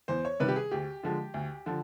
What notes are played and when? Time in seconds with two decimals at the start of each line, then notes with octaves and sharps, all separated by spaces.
0.08 E2 C5
0.25 C#5
0.40 C3 D#3 G3 B4
0.48 G4
0.56 G#4
0.71 D2 G4
1.03 D3 F3 G#3
1.34 D2
1.66 D3 F3